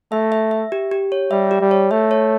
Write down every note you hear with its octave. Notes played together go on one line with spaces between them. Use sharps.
A3 E5
E5
E5
G4
G4
C#5
G3 E5
G4
G3
C#5
A3 E5
C#5